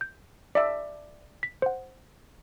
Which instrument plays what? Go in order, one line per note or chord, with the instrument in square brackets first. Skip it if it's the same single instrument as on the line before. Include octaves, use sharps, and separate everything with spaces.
[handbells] G6
[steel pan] D5 E5
[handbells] B6
C5 F#5